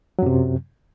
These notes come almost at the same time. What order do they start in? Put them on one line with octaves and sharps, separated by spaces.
F#3 F#2 C3